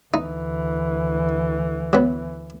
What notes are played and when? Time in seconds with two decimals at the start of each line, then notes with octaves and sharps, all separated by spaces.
0.14 D2 E3 D#4
1.93 F#3 B3